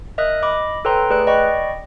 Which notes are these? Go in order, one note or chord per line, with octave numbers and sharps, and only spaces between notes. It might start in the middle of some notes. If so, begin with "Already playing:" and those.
A#4 D#5 E5 D#6 F6 F#6
D#5 B5 D6
A4 B4 C#5 G5 A#5 C6
A3 G#4 B4 D5 F#6 D7
D5 D#5 G5 B5 C#6